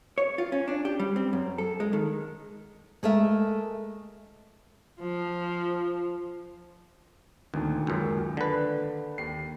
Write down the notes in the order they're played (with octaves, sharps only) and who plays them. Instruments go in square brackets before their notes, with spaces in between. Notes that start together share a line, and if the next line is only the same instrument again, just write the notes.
[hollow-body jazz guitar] C#5
F4
C#4
D4
G4
G3
C4
F#2
A4
G#3
D#3
[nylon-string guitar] G#3 A3 A#4 E5
[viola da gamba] F3
[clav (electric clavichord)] D2 [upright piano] A#2 D#3
[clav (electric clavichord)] C#2 F#2
D3 B4
[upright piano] D#2 C7